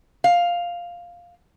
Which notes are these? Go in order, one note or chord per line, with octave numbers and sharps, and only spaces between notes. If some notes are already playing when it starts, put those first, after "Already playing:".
F5